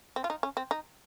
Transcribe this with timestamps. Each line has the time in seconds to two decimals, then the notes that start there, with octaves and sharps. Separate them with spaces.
0.16 C4
0.24 F4
0.30 D#4
0.43 C#4
0.57 C4
0.71 D#4